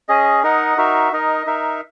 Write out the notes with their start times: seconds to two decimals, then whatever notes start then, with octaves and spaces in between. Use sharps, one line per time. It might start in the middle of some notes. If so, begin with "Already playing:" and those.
0.09 C#4 G#4 D#5
0.43 D#4 A#4 D#5 F#5
0.77 D#4 F#4 A#4 E5
1.12 D#4 A#4 D#5
1.46 D#4 A#4 E5